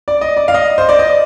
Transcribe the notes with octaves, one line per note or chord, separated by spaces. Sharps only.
D5
D#5
D5
F5
D#5
C5
D5
D#5